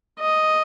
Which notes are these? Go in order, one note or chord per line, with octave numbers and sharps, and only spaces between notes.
D#5